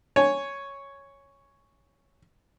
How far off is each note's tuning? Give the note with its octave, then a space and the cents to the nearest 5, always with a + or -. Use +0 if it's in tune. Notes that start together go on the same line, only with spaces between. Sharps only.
C#5 +0 G#5 +0